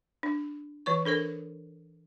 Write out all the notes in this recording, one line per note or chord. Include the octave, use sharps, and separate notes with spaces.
D4
E3 B4 C#6
D4 A4 A#4 C5